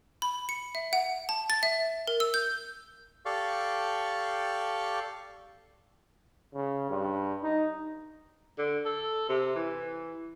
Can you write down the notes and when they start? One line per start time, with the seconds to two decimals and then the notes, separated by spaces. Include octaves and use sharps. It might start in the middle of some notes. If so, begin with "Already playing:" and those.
0.22 B5
0.49 C#7
0.75 E5
0.93 F#5
1.29 A5
1.50 A6
1.63 E5
2.07 A#4
2.20 E6
2.34 G6
3.25 G4 A4 D5 F5 C#6
6.54 C#3
6.90 G2
7.43 D#4
8.58 D3
8.86 A4
9.29 C3
9.56 E3